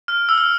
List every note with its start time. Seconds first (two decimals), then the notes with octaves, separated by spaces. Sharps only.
0.08 F6
0.29 E6
0.38 F6